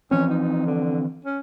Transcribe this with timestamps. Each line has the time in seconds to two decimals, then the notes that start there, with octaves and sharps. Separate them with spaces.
0.11 E3 F3 C4 C#4
0.30 D#4
0.66 D3
1.25 C#4